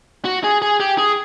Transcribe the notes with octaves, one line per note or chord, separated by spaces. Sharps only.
F#4
G#4
G#4
G4
G#4